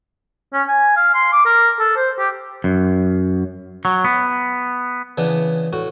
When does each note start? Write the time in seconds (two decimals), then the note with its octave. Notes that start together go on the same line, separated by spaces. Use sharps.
0.53 C#4
0.68 G#5
0.97 F5
1.14 C6
1.33 D6
1.46 A#4
1.80 A4
1.96 C5
2.19 G4
2.64 F#2
3.85 F#3
4.04 B3
5.18 C#3 E3 B3 D4
5.73 A2 F#4